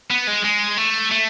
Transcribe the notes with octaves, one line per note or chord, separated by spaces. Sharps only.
B3
G#3
G#3
A3
A3